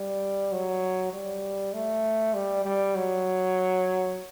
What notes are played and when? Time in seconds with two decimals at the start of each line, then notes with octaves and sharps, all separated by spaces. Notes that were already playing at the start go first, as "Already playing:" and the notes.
Already playing: G3
0.52 F#3
1.13 G3
1.73 A3
2.34 G3
2.65 G3
2.95 F#3